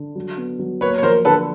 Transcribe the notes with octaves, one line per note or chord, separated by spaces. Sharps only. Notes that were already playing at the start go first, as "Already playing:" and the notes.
Already playing: D3
F#3
B3
F#3
A#3 B4 C#5
C#5
F3 A#4 C5
D3 A4 B4